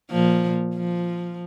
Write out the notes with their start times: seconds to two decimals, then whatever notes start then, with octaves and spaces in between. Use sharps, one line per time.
0.11 A#2 F3
0.75 F3